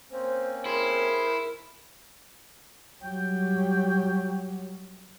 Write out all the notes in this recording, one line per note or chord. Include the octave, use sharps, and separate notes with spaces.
A#3 C4 C#4 C5
E4 G#4 A#4 C5 C6
F#3 G3 G5